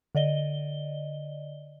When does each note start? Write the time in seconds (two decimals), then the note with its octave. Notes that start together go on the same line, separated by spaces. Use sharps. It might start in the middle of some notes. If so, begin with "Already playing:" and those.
0.15 D3 D5 D#5 G7